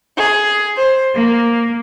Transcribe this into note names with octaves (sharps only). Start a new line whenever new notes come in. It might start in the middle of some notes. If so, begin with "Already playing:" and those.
G#4
C5
A#3